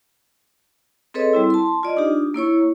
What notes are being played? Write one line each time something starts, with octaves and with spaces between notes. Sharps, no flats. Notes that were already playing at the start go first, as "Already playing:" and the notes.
C4 G#4 A4 B4 C#5 D#5
G3 C4 E4
A5 C6
F4 D5 D#5
D4 D#4 F4 G4
A#3 E4 C#5 C#6